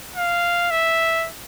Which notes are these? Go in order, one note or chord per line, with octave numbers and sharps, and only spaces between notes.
F5
E5